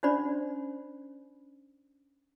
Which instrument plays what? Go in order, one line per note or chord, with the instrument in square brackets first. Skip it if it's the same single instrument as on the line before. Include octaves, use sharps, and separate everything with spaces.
[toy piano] C#4 D4 F#4 C5 D5 B5